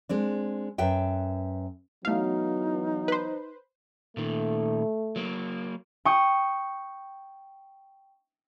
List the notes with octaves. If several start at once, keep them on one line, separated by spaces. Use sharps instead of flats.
G#3 C4 D4
F#2 B4 E5 G5
E3 F#3 A3 B3 D#4 F5
B4 C5
A#2 D#3 A3
F#3 A#3
G5 C#6 D#6